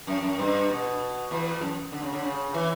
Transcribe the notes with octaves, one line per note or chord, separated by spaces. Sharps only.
F#2
F#2
G2
B2
E2
F#2
D3
C#3
D3
C#3
E3